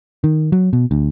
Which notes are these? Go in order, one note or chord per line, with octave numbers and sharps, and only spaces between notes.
D#3
F#3
B2
D2